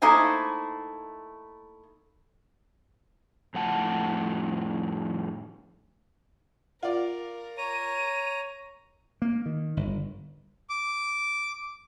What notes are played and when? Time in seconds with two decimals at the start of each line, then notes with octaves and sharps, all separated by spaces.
0.02 A3 A#3 D#4 E4 C5 G#5
3.54 F2 A2 F#5 A5
6.83 F4 A#4 D5
7.58 C#5 A#5 D#7
9.22 A#3
9.46 D#3
9.77 G1
10.69 D6